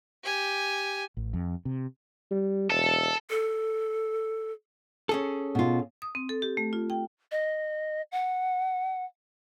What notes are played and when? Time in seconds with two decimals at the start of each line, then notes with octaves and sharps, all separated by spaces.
0.24 G4 G#5
1.17 A1
1.33 F2
1.65 C3
2.31 G3
2.70 E1 A4
3.30 A4
5.09 C#4 G#4 A4
5.55 B2 F4
6.02 D#6
6.15 C4
6.29 A4
6.42 G4
6.57 A3
6.73 F4
6.90 G5
7.31 D#5
8.12 F#5